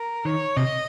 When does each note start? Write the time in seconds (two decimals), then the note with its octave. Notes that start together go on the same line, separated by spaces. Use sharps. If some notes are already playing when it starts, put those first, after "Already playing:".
Already playing: A#4
0.25 D#3 C#5
0.56 C3 D#5